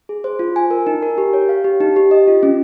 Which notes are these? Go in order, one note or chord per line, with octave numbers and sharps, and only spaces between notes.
G#4
C5
F4
G#5
A#4
D#4
A#4
G4
C#5
F5
G4
D#4
G4
D#5
F4
C#4